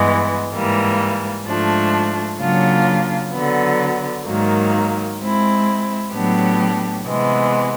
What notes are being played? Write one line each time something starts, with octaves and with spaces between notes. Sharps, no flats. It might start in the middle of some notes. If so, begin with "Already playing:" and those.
Already playing: G2 E3 G#3 B3
G#2 E3 G3 A#3
G#2 F3 A3 D4
C#3 F#3 A#3 D4 F4
D3 F#3 B3
G#2 D#3 F#3 A#3
G#3 C4 E4
A2 F#3 B3 D4 G4
C3 E3 G#3 B3